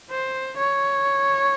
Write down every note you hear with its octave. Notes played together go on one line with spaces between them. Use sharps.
C5
C#5